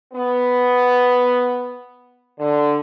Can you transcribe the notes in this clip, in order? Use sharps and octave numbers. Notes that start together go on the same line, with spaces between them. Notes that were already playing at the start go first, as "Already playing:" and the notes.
B3
D3